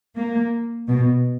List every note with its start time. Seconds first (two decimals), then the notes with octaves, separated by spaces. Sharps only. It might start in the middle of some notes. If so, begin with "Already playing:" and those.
0.15 A#3
0.88 B2